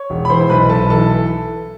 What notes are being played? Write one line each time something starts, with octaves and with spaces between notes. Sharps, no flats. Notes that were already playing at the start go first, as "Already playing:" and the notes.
Already playing: C#5 C#6
E1
B5
E3 C5 C6
B1 B4 B5
B1 A4 A5
E3 A4 A5